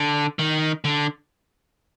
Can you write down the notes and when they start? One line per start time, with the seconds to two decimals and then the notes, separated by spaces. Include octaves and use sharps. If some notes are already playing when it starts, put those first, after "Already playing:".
Already playing: D3
0.39 D#3
0.84 D3